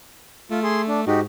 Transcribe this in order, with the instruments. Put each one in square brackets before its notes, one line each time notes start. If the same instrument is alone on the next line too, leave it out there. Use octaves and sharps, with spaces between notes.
[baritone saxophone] A3 [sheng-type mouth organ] F4
[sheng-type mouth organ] G#4 C6
D4
[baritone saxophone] G#2 [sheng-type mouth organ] D#4 F#4 G4